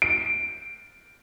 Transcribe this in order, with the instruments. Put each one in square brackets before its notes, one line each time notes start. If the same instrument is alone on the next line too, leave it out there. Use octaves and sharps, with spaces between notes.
[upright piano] D7